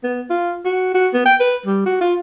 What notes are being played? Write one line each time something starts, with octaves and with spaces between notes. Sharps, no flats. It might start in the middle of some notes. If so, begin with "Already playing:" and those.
B3
F4
F#4
F#4
B3
G5
B4
G3
F#4
F4